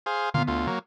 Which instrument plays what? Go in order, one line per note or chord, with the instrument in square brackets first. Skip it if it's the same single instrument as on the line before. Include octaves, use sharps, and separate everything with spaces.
[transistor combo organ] G#4 C5 F5
[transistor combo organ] A#2 F4 F5 [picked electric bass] D3 B3
[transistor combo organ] D2 F4
F#3 A#3